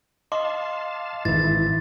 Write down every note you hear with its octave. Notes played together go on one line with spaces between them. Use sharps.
D#5 F5 A5 C6 D6
G#1 G#2 E3 E4 A6